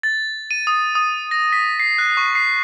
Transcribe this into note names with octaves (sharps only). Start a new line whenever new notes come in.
A6
D#7
D#6
D#6
A#6
B6
C7
F#6
C#6
C7